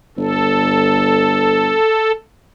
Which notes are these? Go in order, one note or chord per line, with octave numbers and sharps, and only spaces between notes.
G1 A4